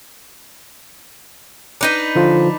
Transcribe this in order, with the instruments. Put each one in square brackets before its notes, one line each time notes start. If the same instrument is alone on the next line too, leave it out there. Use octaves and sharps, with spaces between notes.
[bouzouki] D4 D#4 B4
[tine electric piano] D3 F3 F4